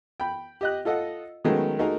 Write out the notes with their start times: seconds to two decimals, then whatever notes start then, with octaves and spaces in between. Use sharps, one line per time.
0.20 G5 B5
0.61 G4 D#5 F#6
0.85 F4 A4 D#5 F#5
1.45 D#3 F#3 G#3 A3 B3 C#4
1.79 A3 A#3 D#4 F#4 G#4 A#4